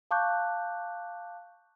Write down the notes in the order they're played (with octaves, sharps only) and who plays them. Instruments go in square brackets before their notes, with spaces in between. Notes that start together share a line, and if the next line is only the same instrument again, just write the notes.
[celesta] F5 A5 C#6 D6 F#6 G6